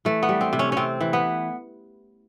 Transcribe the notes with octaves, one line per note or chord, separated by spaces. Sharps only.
E3 A3
B3
G3
C4
C3
C#4
C3 C4 C#4
E3
B3